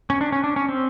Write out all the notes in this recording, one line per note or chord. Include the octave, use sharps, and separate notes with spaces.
C#4
D4
C#4
D4
C#4
C4